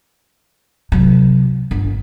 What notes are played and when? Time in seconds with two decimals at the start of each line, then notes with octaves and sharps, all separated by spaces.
0.92 C3 F#3
1.71 G1